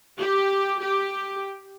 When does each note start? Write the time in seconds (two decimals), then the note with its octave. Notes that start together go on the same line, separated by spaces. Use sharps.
0.18 G4
0.81 G4